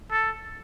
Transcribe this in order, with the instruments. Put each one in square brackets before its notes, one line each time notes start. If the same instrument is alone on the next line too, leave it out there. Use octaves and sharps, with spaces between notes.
[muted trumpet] A4